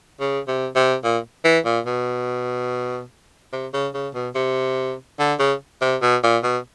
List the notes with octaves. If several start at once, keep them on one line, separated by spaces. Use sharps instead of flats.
C#3
C3
C3
A#2
E3
A#2
B2
C3
C#3
C#3
B2
C3
D3
C#3
C3
B2
A#2
B2